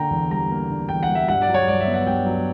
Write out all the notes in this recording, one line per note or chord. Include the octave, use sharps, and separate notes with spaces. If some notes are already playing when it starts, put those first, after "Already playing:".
Already playing: D3 A#3 G5 A#5
E2
G3 A#5
A#3
D3
E2 G5
F#5
G3
E5
G2 F#5
D5
F#3
C#5
G2 D5
E5
B3
F#5
G2 G5
F#3